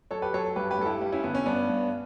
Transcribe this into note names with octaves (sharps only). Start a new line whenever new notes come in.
F#3 A4 C#5
G4 B4
F#3 A4 C#5
G2 G4 B4
G4 B4
G2 A4
E4 G4
G3
C#4 E4
D3 B3
C#4
G2 B3 D4
G2